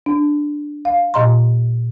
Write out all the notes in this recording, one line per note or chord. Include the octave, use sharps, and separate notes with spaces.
D4
F5
A#2 D#5 A#5 C6